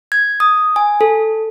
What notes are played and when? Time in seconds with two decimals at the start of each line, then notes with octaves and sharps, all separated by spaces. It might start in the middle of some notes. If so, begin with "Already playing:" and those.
0.12 G#6
0.40 D#6
0.76 G#5
1.01 A4